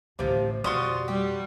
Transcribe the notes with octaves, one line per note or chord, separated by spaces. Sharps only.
A1 D2 C3 F3
F2 B2 G3 F4 F#4 C6 D#6
G3 G4